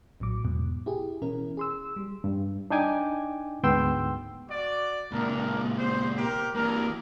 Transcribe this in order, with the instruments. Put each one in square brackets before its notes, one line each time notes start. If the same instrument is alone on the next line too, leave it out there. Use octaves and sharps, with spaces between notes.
[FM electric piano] A#1 A2 F#3 D6
E2 G#2 B2
E4 G4 G#4
B2 E3 C#4 E4 A#4
G#4 C6 E6
G3
[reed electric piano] G2
D4 D#4 G5 G#5 D6
D2 G#2 B3 G5 C6 E6
[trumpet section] F#4 D5
[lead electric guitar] C#2 A#2 [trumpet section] D4 A#4
[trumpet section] C5
G4 A#4
[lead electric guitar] E3 A#3 [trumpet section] D4 A#4